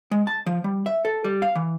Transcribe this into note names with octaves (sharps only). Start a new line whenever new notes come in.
G#3
A5
F3
G3
E5
A4
G3
F5
E3